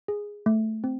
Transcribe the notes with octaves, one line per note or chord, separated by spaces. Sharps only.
G#4
A3
C4